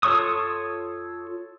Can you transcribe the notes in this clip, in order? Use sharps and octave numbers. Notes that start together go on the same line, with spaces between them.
F4 A4 C#5 C#6 D#6